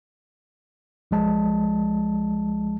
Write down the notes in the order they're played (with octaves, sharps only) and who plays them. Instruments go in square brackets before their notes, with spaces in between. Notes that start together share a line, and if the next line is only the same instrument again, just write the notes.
[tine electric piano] B1 F3 G#3 A5